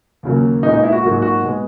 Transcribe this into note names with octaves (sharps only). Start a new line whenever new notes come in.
D#2 C#3 F#3 A#3
A#2 G#3 B3 D#4
D#4
E4
F#4
G#2 F#3 A#3 F#4
F#4
B2 G#3 B3